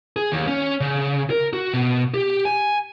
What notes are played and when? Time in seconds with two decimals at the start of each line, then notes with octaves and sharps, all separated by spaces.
0.16 G#4
0.32 D#2
0.47 C#4
0.81 C#3
1.30 A#4
1.53 F#4
1.74 B2
2.14 G4
2.45 G#5